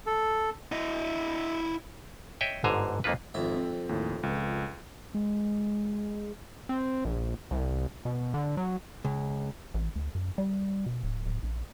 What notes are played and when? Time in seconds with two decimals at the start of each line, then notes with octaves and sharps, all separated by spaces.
0.07 A4
0.72 E4 D#5
2.41 C#5 D#5 E5 G5
2.64 G1 G#2 D3 C5 G#5 A#5
3.04 F2 A#3 D#4 F4 B4
3.34 G#1 F2 E5
3.56 C4
3.89 D#2 A2
4.23 C#2
5.14 G#3
6.69 C4
7.05 A#1
7.51 C2
8.05 B2
8.34 D3
8.57 F#3
9.05 C#2
9.74 A1
9.96 D2
10.15 F#2
10.38 G3
10.86 B2
11.03 D1
11.25 D1
11.43 A#1